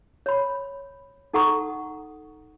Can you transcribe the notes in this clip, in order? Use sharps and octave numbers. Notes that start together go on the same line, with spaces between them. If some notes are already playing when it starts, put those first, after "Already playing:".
C#5 B5
D#4 A4 F#5 A#5 C#6 D#6